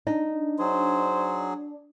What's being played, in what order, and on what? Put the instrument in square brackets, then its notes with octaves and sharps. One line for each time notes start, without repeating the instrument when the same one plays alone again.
[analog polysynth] D4 [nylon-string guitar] D#4
[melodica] F#3 G#4 [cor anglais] C5